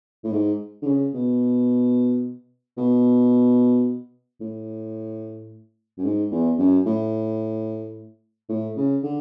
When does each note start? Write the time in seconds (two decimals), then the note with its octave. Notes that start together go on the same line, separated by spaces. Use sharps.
0.24 A2
0.32 G#2
0.82 D3
0.87 C#3
1.14 B2
2.77 B2
4.40 A2
5.98 F#2
6.04 G#2
6.31 E2
6.58 F#2
6.86 A2
8.49 A2
8.76 C#3
9.03 D3